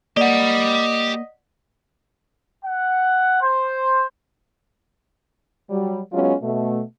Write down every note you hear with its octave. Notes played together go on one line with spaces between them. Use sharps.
A#3 G4 D5 D#5 F#5 B5
F#5
C5
F#3 G3
F#3 G#3 B3 C#4 F4
B2 A3